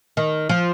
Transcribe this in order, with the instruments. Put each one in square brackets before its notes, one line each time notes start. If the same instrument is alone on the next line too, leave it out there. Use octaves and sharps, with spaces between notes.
[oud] D#3
F3